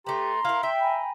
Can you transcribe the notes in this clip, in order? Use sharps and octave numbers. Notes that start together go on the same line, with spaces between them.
A3 G4 B4 A#5 C6
E4 A#4 F5
E5 G5
G#5 A#5 B5